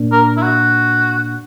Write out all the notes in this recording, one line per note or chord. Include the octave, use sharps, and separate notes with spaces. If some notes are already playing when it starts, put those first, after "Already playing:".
Already playing: A#2 A#3 D4
A#4
E4
F#4